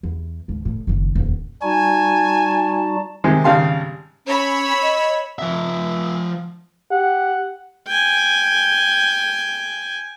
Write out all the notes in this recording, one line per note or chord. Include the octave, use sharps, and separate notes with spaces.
E2
D#2 G#2
A2 E3
F#1 D#3
D#1 E2
G3 D#4 F#4 G#5 A5
C3 D#3 G#3
G#1 C#3 G3 F5 A5 C6
C#4 C#5 B5 E6
D#5
F3 E5
G4 F#5
G5 G#5